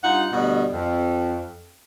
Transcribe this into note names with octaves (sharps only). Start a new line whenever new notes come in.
G2 D#4 F4 F#5
D2 B2 G3 F#4 D#5
F2